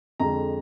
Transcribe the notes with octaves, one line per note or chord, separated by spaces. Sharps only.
F2 D3 G#3 A#5